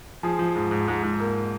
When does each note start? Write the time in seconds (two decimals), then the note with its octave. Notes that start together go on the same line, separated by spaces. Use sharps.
0.23 F3 G#4
0.39 F3
0.56 G#2
0.71 G#2
0.88 G#2
1.03 G#2
1.20 A#3